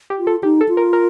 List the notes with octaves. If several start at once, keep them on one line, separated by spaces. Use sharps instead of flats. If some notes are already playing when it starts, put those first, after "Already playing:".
G4
F4
A4
D#4 G4
A4
F4
A#4
A#4